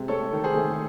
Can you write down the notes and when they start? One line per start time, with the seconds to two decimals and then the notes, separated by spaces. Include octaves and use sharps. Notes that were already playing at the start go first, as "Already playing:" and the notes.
Already playing: C3 G#3
0.08 A3 A4 C#5
0.33 D#3
0.44 G#4 C5
0.55 A3